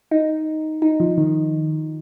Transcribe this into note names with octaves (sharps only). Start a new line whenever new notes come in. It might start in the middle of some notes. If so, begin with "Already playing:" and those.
D#4
D#4
F3
D#3